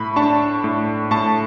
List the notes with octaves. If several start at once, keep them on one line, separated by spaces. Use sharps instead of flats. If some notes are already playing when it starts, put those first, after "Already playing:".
Already playing: A2 B5
D4 A5 C#6
A2
A2 A5 C#6